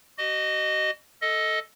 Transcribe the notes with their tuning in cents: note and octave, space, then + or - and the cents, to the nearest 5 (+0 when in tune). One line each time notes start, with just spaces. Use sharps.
F#4 +45 D#5 -15
A4 +0 D#5 +15